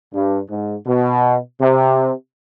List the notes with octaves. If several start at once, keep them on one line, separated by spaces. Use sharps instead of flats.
G2
G#2
B2
C3